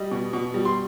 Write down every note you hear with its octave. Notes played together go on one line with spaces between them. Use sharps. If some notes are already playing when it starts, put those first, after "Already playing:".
Already playing: G3 D#5
B2
B2
G3
C6